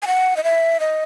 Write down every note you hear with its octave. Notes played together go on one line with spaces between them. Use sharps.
G#5
F#5
D#5
E5
D#5